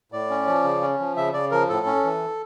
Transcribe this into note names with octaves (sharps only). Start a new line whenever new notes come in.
A2 D5
C#4
F3
C#3
C#4
F3
C#3 E5
C#3 D5
F3 A#4
A2 A4
C#4
E3